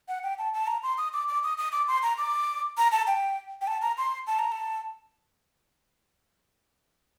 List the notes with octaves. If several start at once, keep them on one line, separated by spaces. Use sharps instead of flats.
F#5
G5
A5
A5
A#5
C6
D#6
D6
D6
D#6
D#6
D6
C6
A#5
D6
A#5
A5
G5
G5
A5
A#5
C6
A5
A#5
A5